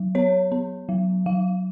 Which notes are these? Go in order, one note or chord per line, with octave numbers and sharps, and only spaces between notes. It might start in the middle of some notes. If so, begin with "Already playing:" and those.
Already playing: F#3
B3 C#5
B3
F#3
F#3 F5